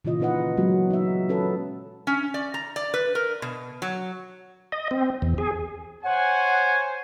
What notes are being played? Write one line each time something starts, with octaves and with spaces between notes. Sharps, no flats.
A#2 C#3 E3 F4 D#5
A#2 D#3 D#4 B4 D#5 F#5
F#3 G#3 B3 F#4
D#4 E5
C#4 A4 B4
C#4
D5
A#5
D5
B4
A#4
B2
F#3
D#5
C4
E2
G#4
C5 C#5 F#5 G#5